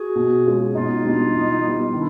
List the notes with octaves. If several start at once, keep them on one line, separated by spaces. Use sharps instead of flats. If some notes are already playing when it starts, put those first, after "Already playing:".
Already playing: F#4 G#4
B2
G#3 C#4 F4
B2 D#4 F4
G3 B3 D4
E3
G3 B3 E4
D#3 D4 E4